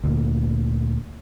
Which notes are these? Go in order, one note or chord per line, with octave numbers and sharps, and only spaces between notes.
D2 A#2 D3